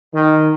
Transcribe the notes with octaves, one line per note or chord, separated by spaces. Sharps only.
D#3